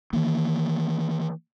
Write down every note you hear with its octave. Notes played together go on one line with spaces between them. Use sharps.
D#3 E3 A#3